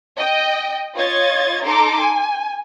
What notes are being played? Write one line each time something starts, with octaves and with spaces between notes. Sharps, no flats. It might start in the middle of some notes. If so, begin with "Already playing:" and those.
D#5 G5
F4 C#5 D#5 G#6 A6
D#4 A4 A#5 C6 D6
G#5